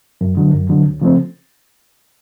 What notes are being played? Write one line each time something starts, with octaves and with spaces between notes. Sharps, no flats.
F#2
D3 F#3
F#2
D3 F#3
D2
C#3 F3 A3 C4